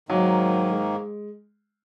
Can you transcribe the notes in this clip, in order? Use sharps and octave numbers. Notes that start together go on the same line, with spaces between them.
G#2 D#3 F#3 A#3
G#3